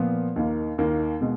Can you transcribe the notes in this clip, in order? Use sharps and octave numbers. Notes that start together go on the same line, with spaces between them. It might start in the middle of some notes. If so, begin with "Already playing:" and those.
Already playing: A#2 F3 B3
D#2 D#3 A#3
D#2 D#3 A#3
B2 G#3